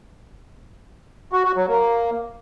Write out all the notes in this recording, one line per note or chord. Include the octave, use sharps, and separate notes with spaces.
F#4
F#4
F#3
A#3